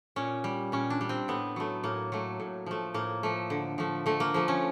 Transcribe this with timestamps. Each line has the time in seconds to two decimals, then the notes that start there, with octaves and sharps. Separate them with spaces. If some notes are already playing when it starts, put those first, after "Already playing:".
0.16 A#2 C#4
0.44 G3
0.72 A#2 C#4
0.90 D4
1.01 G3
1.09 C4
1.28 A2 B3
1.56 F#3 A3
1.83 A2 A#3
2.12 F#3 A3
2.40 A2
2.66 F3 A3
2.94 A2 A#3
3.23 F3 A3
3.50 D3
3.78 F3 A3
4.06 D3 A3
4.20 A#3
4.34 F3 A3
4.48 C#4